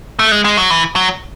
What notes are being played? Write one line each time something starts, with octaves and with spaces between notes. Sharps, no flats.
A3
G#3
G#3
F#3
E3
F#3